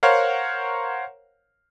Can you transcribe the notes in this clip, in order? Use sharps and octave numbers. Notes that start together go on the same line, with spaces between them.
A#4 C5 C#5 F5 F#5